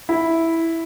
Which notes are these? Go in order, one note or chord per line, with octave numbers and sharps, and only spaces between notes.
E4